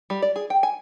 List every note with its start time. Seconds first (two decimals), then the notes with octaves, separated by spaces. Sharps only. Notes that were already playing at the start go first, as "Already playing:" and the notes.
0.10 G3
0.22 D5
0.36 G#4
0.50 G5
0.63 G#5